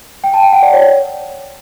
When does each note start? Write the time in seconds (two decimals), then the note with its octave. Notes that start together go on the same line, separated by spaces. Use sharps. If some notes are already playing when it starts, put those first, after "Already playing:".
0.24 G5
0.34 A5
0.43 G5
0.53 F#5
0.63 D5
0.73 C#5